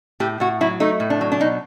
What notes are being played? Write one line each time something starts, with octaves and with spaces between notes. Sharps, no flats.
A2 G4
A2 F#4
F#3 E4
A3 D#4
A2
D4
F#3
D4
B2 D#4